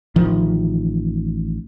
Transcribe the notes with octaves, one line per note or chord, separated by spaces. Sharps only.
A1 D#3 F3